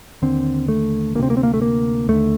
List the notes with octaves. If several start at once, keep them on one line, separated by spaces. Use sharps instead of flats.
D#2 D3 C4
A3
D2 C3 A#3 C4
A#3
C4
A#3
A3
A#3
D#2 D3 A3